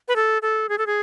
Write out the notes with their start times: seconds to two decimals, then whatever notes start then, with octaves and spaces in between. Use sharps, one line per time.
0.08 B4
0.16 A4
0.42 A4
0.69 G#4
0.78 A4
0.87 G#4